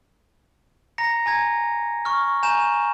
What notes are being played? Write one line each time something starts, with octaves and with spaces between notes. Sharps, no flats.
A#5 A#6 C#7
G#5 A#5 G#6
C#6 F6
G#5 A#5 G6 E7